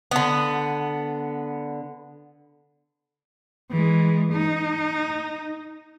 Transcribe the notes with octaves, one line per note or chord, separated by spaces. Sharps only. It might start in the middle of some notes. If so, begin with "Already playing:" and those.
D3 B3
E3 G#3
D#4